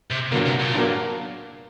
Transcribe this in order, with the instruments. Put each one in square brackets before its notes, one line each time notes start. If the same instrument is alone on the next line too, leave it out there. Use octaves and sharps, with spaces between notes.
[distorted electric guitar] C3
[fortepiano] G2 F#3 A#3 [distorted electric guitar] D3
[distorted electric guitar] C3
A#2
[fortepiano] G2 F#3 A#3